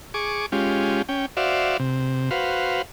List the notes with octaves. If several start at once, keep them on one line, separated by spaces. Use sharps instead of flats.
G#4 C#6 D6
G#3 C#4 F4 G4
C#4 G5
F#4 C5 D5 E5 F5
C3
F#4 B4 C5 F5